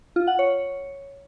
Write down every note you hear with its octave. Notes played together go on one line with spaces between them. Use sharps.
F4
F#5
C#5